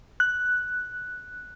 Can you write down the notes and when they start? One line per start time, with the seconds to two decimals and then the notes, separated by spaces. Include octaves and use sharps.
0.20 F#6